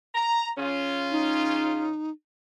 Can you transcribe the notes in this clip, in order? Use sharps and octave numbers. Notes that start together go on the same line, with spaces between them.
A#5
C#3 C#4 F4
D#4